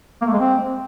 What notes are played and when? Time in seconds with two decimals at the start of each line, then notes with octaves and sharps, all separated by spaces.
0.22 A#3
0.27 A3
0.33 G#3
0.39 C4